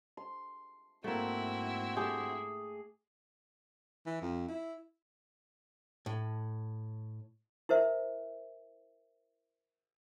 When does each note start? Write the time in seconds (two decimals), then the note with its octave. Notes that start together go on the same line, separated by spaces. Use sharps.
0.17 C6
1.04 G#2 A3 A#3 C4 E4 F#4
1.97 A3 G4 G#4
4.06 E3
4.21 F2
4.48 E4
6.06 A2
7.69 E4 A#4 C5 E5